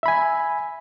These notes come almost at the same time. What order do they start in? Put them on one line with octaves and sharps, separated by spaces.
E5 B5 G#5